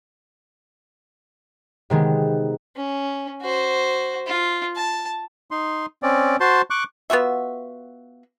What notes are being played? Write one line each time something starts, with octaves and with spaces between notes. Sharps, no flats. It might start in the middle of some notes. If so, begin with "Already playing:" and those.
C3 D#3 G#3 B3
C#4
F#4 C5
F4
A5
D#4 C6
C4 C#4 D5
F#4 C5 A5 C6
C#6 D6 F#6
B3 F4 F#4 E5